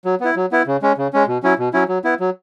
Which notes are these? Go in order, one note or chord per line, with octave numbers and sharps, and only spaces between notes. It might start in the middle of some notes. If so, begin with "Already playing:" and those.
F#3
B3 E4
F#3
B3 E4
C#3
G#3 C#4
C#3
G#3 C#4
B2
F#3 C#4 E4
B2
F#3 C#4 E4
F#3
B3 E4
F#3